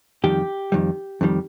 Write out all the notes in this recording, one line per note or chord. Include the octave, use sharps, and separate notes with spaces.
F2 D#3 G3 G4
F2 D#3 G3
F2 D#3 G3